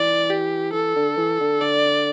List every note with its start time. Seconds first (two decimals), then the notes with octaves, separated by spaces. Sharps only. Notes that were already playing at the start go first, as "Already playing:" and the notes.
Already playing: E3 D5
0.30 G4
0.73 E3 A4
0.96 D3
1.17 E3
1.40 D3
1.61 D3 D5